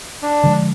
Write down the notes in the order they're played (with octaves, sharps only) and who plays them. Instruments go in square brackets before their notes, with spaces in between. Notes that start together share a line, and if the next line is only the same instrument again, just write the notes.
[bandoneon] D4
[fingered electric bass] D3 F3 G#3